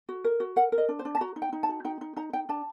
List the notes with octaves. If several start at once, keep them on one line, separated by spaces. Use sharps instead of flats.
F#4
A#4
F#4
A#4 F#5
A#4
D#5
D4
C5
D4
A5
F#4 A#5
D#4
G5
D#4
A5
F#4
D#4 G5
D#4
D#4 A#5
D#4 G5
D4 A5